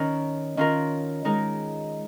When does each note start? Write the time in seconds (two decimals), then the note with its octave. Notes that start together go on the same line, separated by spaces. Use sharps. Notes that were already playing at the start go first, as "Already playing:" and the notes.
Already playing: D#3 C#4 A#4
0.57 D#3 C#4 F4 A#4
1.25 D#3 G#3 D#4 A#4